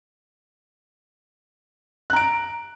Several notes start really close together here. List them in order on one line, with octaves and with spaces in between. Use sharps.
F#6 A#5 D7